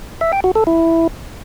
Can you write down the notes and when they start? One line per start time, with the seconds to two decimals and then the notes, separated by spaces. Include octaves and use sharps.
0.21 E5
0.33 G5
0.44 F#4
0.55 A4
0.67 E4